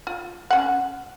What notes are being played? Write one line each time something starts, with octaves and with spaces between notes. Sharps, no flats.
F4
C#4 F#5